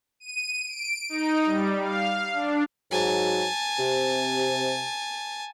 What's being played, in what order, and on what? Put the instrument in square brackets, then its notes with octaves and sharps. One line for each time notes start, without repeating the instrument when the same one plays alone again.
[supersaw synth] D#7
D7
D#4
G3
F5
D4
[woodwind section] G#2 F#3 [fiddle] G#5 A5
[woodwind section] C3